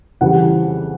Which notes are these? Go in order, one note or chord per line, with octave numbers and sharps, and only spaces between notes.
F2 C#3 E3 G3 F#5